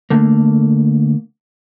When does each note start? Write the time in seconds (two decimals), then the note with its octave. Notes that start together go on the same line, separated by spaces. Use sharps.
0.10 D3 A3 A#3